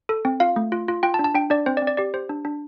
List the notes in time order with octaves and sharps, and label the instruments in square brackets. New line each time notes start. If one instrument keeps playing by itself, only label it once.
[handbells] A4
C4
F4 F5
A3
F4
F4
F4 G5
A5
D4
A5
D4 G5
D4 D5
C4 C5
D5
C4
D5
G4 D5
G4 C5
D4
D4